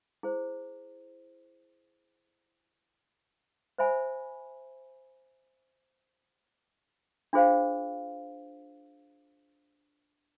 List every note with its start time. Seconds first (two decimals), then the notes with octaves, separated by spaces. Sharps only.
0.23 E4 G#4 C5
3.78 C5 E5 G#5 B5
7.33 D4 F4 G#4 C5 F5